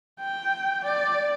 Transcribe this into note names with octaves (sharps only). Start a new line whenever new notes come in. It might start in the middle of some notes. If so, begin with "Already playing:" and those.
G5
D5